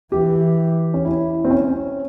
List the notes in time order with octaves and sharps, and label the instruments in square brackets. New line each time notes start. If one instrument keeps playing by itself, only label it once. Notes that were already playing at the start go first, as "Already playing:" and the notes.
[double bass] E3 [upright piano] G4
[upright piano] C#4
E4
C4
C#4